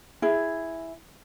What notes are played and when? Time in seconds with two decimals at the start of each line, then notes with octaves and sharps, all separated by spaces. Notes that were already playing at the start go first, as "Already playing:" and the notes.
0.22 E4 G#4